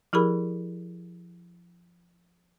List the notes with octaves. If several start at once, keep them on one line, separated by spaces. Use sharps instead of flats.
F3 E4 G4 G#4 A#4 B5